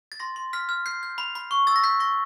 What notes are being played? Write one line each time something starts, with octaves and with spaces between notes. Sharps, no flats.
A6
C6 A#6
C6
F6 B6
F6
G6 C7
G6
B5
B5
C#6
E6 A6
A#6
G6 B6
C#6 A#6